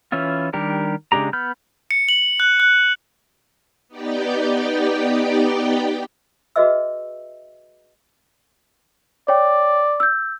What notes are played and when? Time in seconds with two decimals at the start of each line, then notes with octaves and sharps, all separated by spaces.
0.12 E3 C#4 E4 F4
0.53 D#3 G3 D4 G4 A#4
1.12 C#3 G#3 D4 G4 A#5
1.33 B3 B5 F6 G6
1.91 C#7
2.09 F#7
2.40 F#6
2.60 F#6
3.89 B3 D#4 G4 D5 G5
6.56 F#4 G#4 B4 D#5 E5 E6
9.28 C#5 D5 G5
10.00 E6 G6